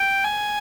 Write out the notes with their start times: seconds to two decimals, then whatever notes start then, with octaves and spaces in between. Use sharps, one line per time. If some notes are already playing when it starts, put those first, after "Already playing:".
Already playing: G5
0.24 G#5